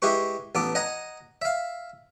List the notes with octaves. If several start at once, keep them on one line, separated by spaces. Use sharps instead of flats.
G#3 E4 G4 B4 C#6
A1 B3 A4 D6
D#5 F#5 G#5 A#5
E5 F5